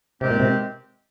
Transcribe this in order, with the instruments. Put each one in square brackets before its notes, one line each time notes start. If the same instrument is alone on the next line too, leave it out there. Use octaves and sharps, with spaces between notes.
[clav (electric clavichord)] C3 [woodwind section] D#3 G#3 C4 G4
[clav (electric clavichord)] A#2
C3